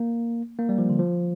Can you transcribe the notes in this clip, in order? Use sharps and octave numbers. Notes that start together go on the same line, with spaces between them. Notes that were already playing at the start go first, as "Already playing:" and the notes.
Already playing: A#3
A#3
G3
F3
D3
F3